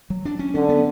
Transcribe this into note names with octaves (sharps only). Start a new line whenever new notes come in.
F#3
D4
C#4
D3 C#4
B3